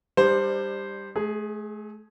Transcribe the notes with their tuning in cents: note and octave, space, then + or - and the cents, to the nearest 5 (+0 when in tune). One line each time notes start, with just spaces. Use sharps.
G3 +15 D4 +30 C5 +0
A3 -40 G#4 +0